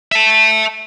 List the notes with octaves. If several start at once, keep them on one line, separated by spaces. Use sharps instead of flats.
E5 A5